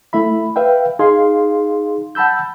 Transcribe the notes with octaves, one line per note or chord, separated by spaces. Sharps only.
A3 E4 E5 B5
B4 E5 F5 G5
D#4 G#4 F5 C6
F#5 A5 B5 E6 G6